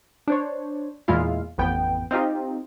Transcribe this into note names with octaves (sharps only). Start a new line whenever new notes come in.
D4 C5 C#5
E2 A#2 G#3 E4 F4 F5
A1 F2 B3 G5
C4 D#4 F4 G4